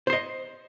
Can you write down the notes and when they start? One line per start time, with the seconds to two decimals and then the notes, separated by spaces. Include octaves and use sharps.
0.07 C5
0.10 C6
0.13 D#5